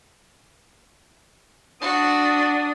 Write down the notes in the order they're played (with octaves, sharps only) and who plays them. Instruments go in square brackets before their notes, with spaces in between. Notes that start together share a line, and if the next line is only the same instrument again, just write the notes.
[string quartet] D4 D#6 [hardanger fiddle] F#4